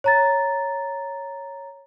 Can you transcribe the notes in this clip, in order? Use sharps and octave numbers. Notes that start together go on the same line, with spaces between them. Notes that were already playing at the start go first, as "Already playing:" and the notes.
C#5 A#5 A6